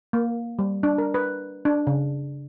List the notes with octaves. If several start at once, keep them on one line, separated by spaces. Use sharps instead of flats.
A#3
G3
D4
A#4
B4
D4
C#3